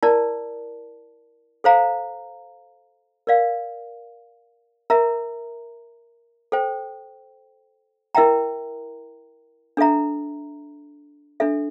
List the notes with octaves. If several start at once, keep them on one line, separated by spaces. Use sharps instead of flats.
E4 A#4 D5 A5
A4 C5 F5 A#5
A#4 D5 F5
A#4 E5 A#5
A4 C5 G5
E4 A#4 E5 G5 A#5
D4 A4 E5 A#5
D4 A4 E5